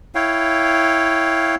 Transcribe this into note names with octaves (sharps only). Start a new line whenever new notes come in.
E4 C#5 F5 G5